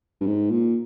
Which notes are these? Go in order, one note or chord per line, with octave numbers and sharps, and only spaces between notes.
G2
G#2
A#2